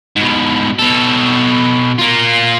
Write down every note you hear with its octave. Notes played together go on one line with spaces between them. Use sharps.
G#2 B2
B2 A4
A#3 F4